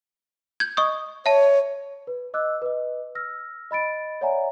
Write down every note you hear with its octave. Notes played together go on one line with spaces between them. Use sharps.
G6 G#6
D#5 C#6 D#6
C#5 E5 A5
B4
D#5 D6 E6 F#6
B4 D#5
E6 F6 A#6
D#5 B5 A6 D7
C#5 D5 E5 F#5 G#5 A#5